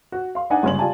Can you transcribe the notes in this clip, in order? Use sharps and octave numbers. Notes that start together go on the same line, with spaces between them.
F#4
F5 C6
D4 D#4 D#5 F#5 G#5
G1 C#3 G#3 C#4 C6 F#7
F4 G4 D5 G#5 A5